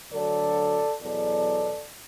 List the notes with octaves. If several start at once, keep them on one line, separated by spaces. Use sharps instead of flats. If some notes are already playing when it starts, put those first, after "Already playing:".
D2 D3 F#3 A4 D5
E2 B2 F#3 A4 D5